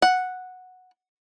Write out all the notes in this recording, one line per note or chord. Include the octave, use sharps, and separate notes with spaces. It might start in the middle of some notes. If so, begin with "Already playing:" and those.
F#5